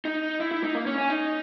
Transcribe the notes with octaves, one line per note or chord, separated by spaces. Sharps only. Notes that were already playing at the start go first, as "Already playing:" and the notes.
D#4
E4
E4
D#4
A#3
C#4
C#4
D#4